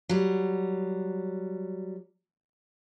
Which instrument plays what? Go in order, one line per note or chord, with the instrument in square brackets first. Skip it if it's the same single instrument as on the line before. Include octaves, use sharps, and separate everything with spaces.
[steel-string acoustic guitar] F#3 G3